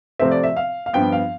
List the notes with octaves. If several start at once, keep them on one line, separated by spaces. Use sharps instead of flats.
C3 F3 A3 C4 E5
D5
E5
F5
F5
G2 F3 B3 G5
F5